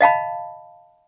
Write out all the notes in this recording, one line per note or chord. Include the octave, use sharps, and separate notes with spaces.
D#5 F5 A5 B5